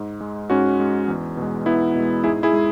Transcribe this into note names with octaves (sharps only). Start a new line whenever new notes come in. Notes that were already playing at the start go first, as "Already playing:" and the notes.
Already playing: G#2
G#3
G#2 C#4 F#4
G#3
E2
B2 G#3
E2 B3 E4
B2 G#3
G#2 E4 G#4
E4 G#4
G#3